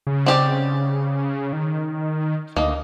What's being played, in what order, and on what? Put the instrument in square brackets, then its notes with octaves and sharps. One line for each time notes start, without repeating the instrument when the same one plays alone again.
[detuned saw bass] C#3
[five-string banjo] C4 G4 D5
[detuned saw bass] D#3
[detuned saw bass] D2 [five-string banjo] A#3 D#4